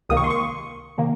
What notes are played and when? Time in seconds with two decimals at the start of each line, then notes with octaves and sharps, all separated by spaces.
0.09 C#2 C3 D#3 A#3 D#6
0.17 C#6
0.24 C6
0.30 C#6
0.98 C3 D#3 A#3